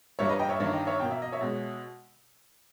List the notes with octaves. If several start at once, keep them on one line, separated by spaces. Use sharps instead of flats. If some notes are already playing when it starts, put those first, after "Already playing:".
G2 G3 A#3 C#5 E5
B4 D#5
D#5 G5
C#5 E5
G2 D#3 A#3 C#5 E5
D#5 G5
C#5 E5
B2 A#3 G5
E5
D#5
C#5 E5
B2 G#3